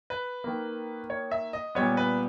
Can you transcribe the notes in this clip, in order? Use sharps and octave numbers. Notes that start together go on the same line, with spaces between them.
B4
D#3 A#3
C#5
E5
D#5
A#2 G3 B3 C#5
B4